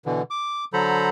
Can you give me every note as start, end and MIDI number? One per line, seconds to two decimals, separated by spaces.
0.06 0.22 47
0.06 0.22 50
0.06 0.22 52
0.30 0.65 86
0.73 1.09 50
0.73 1.09 54
0.73 1.09 69
0.73 1.09 72
0.73 1.09 82
0.73 1.09 83